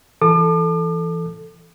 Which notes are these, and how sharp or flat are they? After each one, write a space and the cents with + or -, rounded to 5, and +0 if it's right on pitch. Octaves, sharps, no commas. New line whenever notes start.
E3 +15 A4 +0 D6 +40